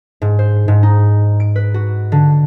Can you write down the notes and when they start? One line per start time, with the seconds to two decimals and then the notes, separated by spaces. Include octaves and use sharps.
0.22 G#2
0.39 C5
0.68 G#2
0.83 D#4
1.40 D7
1.56 B4
1.74 F#4
2.12 D3